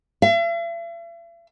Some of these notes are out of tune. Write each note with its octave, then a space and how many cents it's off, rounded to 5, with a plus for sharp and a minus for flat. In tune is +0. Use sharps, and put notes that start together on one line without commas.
E5 +45